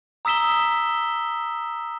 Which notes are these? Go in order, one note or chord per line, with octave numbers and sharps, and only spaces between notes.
A#5 D#6 E6 B6 E7 G7